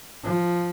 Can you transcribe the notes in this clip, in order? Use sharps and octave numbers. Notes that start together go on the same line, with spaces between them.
F3